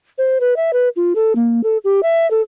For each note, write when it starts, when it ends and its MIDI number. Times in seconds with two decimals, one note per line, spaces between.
0.18 0.38 72
0.40 0.56 71
0.56 0.71 76
0.73 0.88 71
0.96 1.13 65
1.15 1.35 69
1.35 1.61 58
1.63 1.77 69
1.84 2.00 67
2.03 2.29 76
2.31 2.41 69